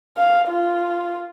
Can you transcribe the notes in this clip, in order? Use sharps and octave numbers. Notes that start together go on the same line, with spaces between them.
F5
F4